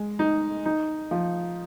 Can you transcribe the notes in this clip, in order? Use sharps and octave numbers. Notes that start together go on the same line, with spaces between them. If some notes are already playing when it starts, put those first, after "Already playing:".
Already playing: G#3
D#4
D#4
F3